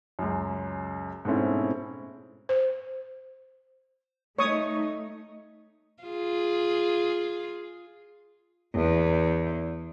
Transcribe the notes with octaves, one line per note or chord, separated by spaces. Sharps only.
C#2 F#2
G#2 B2 A3 C4 C#4 E4
C5
A3 D#4 C#5 C#6 D#6
F4 G#4
E2